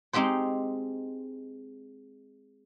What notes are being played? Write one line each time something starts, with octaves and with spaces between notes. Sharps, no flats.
G#3 C4 D#4 G4 C5